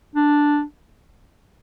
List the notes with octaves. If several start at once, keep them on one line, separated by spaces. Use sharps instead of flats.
D4